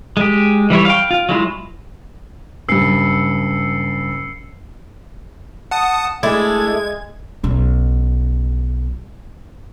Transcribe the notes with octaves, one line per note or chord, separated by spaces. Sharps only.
G#3 G4
E3 G3 E4 C#5
F5 G5
F4
F#3 G#3 E4 F4
F#1 G2 E6 C7 C#7
F#5 A5 D#6
G#3 A3 D4 E4 G#6
B1 C#4